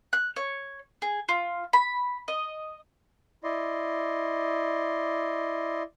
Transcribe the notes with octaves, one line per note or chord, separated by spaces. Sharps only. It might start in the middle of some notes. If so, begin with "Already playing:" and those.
F#6
C#5
G#4
F4
B5
D#5
E4 D5 D#5 C6